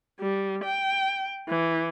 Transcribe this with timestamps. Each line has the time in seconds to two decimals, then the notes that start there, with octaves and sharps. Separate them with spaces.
0.20 G3
0.64 G5
1.49 E3